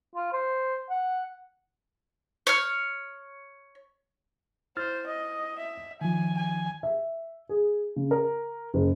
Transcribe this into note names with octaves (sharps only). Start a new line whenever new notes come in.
F4
C5
F#5
C#5 F6
E4 C5 F6 A6
D#5
E5
D#3 F3 G#5
G#5
E5
G#4
C#3
A#4
F#1